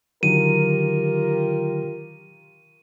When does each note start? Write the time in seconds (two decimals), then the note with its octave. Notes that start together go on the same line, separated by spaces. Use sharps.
0.23 D3 D#3 F#3 F4 G4 A#4 D#7